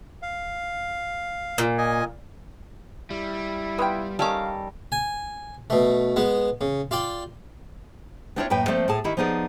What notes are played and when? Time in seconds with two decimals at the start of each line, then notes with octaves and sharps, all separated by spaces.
0.22 F5
1.58 A#2
1.78 D#5 G#5
3.10 G3 E4
3.78 B3 F4 G5
4.19 D#3 G3 C#4 A4 F5 A#5 D6
4.92 G#5
5.70 B2 A3
6.16 G#3 B3
6.61 C#3
6.91 F4 D5 G5
8.36 B3 C4 D4 E4 F4 C#5
8.50 F#2 A2 A#3 B4 G5
8.68 F3 A3 A#3 C4 D5
8.88 A2 G#4 A5
9.04 D#3 E4 G4
9.17 F3 B3 D#4 G#4 D5